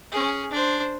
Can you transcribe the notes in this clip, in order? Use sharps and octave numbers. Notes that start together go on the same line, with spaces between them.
C#4 G#4
D4 C5